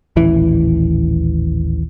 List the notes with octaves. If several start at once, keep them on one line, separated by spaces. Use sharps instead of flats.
D#1 A1 E3